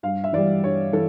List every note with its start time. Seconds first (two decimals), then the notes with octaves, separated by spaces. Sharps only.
0.03 G2 F5
0.24 E5
0.33 E3 G3 D5
0.64 G2 C#5
0.93 E3 A4